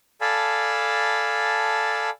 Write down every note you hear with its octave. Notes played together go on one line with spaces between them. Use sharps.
A4 D5 F5 G#5 A5 B5